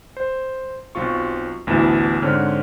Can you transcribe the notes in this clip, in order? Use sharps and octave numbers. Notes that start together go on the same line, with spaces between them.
C5
B1 C4 F4 C#6
A1 D2 B3 E4 A5 E7
G#2 D3 C4 C#5 F6